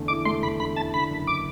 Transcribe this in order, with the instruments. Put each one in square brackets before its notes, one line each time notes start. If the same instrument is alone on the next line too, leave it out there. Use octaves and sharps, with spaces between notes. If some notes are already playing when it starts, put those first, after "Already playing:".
Already playing: [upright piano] E2 D3 A3
[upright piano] E4 [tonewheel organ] D6
[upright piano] A3 [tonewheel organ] C6
[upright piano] E2 [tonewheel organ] B5
[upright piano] D3 [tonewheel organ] B5
[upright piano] E4 [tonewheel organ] A5
[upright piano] D3 [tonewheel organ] B5
[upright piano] F#1
[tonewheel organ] D6